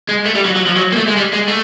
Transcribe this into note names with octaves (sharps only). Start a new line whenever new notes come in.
G#3
A3
G3
F#3
F#3
F3
F#3
A#3
A3
G#3
G3
G#3
A3